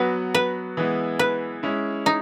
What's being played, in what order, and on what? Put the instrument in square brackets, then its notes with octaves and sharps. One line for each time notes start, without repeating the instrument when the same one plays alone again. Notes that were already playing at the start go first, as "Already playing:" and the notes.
Already playing: [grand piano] F#3 B3 F#4 [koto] B4
[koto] B4
[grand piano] E3 G#3 B3 E4
[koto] B4
[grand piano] G#3 C#4 E4
[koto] D#4